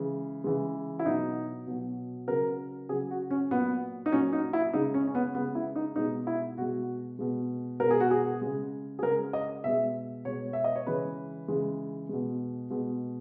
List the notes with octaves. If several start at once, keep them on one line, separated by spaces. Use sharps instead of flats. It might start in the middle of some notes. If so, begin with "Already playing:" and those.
Already playing: C#3 E3 G#3
C#3 E3 G#3
E4
B2 F#3 D#4
B2 F#3
C#3 F#3 A#4
C#3 F#3 G#4
F#4
C#4
A#2 F#3 B3
D#4
A#2 F#3 C#4
D#4
E4
C#3 G#3 D#4
C#4
C#4
B3
C#3 G#3 B3
E4
D#4
B2 G#3 D#4
E4
B2 G#3 F#4
B2 G#3
B2 G#3 A#4
G#4
F#4
G#4
C#3 G#3
G#4
C#3 G#3 A#4
D#5
B2 G#3 E5
B2 G#3 C#5
E5
D#5
C#5
C#3 E3 G#3 B4
C#3 E3 G#3
B2 G#3
B2 G#3